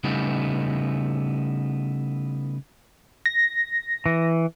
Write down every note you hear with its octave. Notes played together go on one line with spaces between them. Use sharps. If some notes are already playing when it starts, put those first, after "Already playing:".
C#3 G3 A3 B3 D#4 E4
A#6
E3